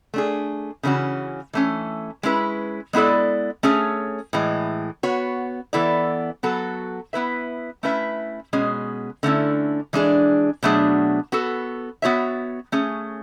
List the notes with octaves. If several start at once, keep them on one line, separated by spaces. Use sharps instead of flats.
A3 D4 G#4
C#3 E3 A3 C#4 F#4
E3 A3 C#4
G#3 C#4 E4 B4
G#3 B3 E4 A4 D5
A3 C#4 G#4 C#5
A2 E3 G#3
B3 F#4 C#5
E3 B3 E4 A4 D5
F#3 B3 F#4 A4
B3 E4 B4 E5
A3 C#4 E4 B4 E5
B2 G#3 C#4 G#4
D3 A3 C#4 E4
E3 G#3 D4 G#4
B2 F#3 A3 D4 G#4
B3 F#4 A4
B3 F#4 C#5 E5
A3 C#4 G#4